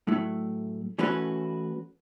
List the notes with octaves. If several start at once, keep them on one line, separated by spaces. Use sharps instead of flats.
A2 F#3 A3 E4
E3 A3 C#4 F#4 B4